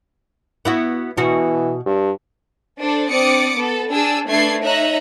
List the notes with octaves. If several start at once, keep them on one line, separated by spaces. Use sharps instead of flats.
B3 E4 F#4
B2 E3 F#4
G2
D4 A4 C5 D5
C4 D4 D5 D6 D#6 C#7
B3 A4 B4
D4 G#4 A5 E6
A3 D4 A4 B4 G#6 C7
D#4 C#5 E5 A#5 F#6